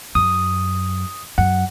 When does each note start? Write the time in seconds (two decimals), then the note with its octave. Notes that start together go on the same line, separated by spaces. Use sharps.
0.15 F#2 D#6
1.38 F#2 F#5